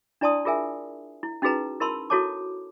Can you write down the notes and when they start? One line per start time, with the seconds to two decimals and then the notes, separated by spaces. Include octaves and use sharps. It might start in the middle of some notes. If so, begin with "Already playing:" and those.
0.21 D4 E4 D5 A5 C6 D#6
0.45 F4 G#4 A#4 E5 G#5
1.23 E4
1.42 C#4 D#4 F#4 G#4 B4 A#5
1.80 E4 A#4 A5 B5 C6 E6
2.10 E4 F#4 A4 C#5 A5 D6